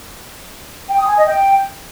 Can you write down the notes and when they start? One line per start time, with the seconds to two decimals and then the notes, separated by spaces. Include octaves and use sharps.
0.89 G5
0.98 D#6
1.08 G#5
1.17 D#5
1.27 G5